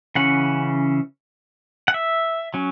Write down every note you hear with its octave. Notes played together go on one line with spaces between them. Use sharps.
C#3 E3 C#4 F#5
F#5
E5
F#3 C#4